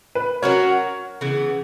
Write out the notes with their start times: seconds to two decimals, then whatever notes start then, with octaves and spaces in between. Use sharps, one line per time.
0.15 B4
0.42 F#3 C#4 F#4 A#4 C#5
1.21 C#3 E3 B3